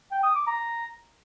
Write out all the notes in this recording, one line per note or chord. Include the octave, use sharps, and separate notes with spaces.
G5
D#6
D6
A#5